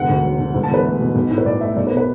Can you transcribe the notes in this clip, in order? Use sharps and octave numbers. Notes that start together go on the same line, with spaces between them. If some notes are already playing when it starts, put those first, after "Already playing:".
Already playing: E1 D3 F#5
D2
F#3
D3
E1
A5
E2 B4
A3
B2
B1
A2
B4
B1 D5
A3 E5
B1 D5
B4
B2
B4